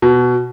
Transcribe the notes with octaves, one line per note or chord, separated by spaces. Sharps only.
B2